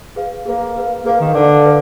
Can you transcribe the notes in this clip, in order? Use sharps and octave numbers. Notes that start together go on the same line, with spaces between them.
G#4 B4 F5
A#3 G#4 B4 F5
G#4 B4 F5
A#3 G#4 B4 F5
D#3
D3 B4 D5 F5
B4 D5 F5